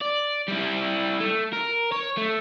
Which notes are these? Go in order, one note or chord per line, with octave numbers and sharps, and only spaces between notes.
D5
G3 E4
A3
A#4
C#5
A3